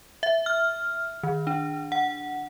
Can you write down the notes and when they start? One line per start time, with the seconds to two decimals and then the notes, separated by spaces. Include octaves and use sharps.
0.23 E5
0.46 F6
1.23 D#3
1.47 D4
1.92 F#5